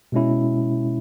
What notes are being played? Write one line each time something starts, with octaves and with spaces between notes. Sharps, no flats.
B2 G#3 C#4 E4